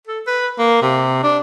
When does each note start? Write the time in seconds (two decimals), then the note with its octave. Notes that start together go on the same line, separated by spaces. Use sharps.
0.07 A4
0.27 B4
0.59 A#3
0.82 C3
1.24 D4